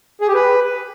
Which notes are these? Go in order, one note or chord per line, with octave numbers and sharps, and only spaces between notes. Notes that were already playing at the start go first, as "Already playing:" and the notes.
G#4
G4
B4